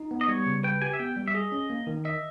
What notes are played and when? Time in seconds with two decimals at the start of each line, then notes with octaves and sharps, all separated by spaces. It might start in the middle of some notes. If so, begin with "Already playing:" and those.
Already playing: D#4
0.11 B3
0.21 D#5
0.28 G3 C#5
0.46 C#3
0.64 B4 G5
0.82 G4 G#5
0.93 E5
0.99 B3 G5
1.17 G3
1.28 E5
1.35 G#4 D#5
1.52 C#4
1.70 A#3
1.87 D#3
2.05 D#5 E5